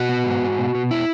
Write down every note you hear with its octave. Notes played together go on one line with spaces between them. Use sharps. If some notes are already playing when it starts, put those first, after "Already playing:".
Already playing: B2 F#4
B3
G#2
G#2
B2
B2
E4